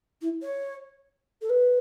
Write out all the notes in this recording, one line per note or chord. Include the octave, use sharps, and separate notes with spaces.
E4
C#5
A4
B4